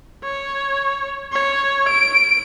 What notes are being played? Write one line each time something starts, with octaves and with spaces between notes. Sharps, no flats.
C#5
C#5
D7